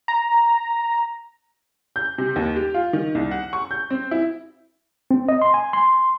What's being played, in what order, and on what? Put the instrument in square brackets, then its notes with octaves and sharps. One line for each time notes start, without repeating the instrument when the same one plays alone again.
[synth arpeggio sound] A#5
[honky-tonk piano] G6
C3
D#2
G4
F4
D#3
C2
F#5
C#6
G6
C4
E4
[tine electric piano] C4
D#5
C6
G#5
C6